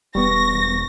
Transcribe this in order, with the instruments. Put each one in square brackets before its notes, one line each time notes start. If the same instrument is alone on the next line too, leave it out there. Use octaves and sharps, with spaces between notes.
[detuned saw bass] E1 [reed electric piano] G3 B3 [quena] C#6 [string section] A#6